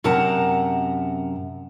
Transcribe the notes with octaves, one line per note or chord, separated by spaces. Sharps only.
F#2 C3 A#4 F#5 A5 A#5